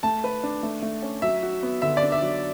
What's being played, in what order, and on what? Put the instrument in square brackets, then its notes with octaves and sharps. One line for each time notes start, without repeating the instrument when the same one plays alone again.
[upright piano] A3 [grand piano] A5
[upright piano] B4
D4
A3
A3
C#4
[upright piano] F#3 [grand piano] E5
[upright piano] F#4
B3
[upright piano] D3 [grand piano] E5
[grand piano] D5
[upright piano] D4
[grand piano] E5
[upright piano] F#3